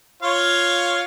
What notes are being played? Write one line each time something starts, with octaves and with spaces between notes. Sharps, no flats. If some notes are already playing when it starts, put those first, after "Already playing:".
F4 C#5 F5